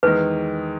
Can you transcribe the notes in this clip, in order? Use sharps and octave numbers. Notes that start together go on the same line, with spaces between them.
E2 D#3 G#3 B4